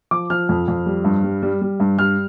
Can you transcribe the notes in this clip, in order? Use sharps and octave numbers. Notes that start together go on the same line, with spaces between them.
F3 D6
F3 F6
F2
F2
G3
G2
G3
G3
G3
G2
G3 F6